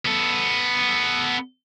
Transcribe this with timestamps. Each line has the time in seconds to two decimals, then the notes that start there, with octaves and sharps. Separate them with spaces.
0.06 B3 A4